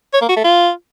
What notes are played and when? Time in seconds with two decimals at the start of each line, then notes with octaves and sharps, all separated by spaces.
0.13 C#5
0.21 A#3
0.29 F#4
0.36 A3
0.44 F4